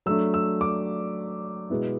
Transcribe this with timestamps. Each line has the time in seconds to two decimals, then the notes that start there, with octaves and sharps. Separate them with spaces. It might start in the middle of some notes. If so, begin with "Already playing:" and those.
0.06 F#3 A3 D4 E6
0.34 E6
0.61 D6
1.70 B2 G#3 B3 E4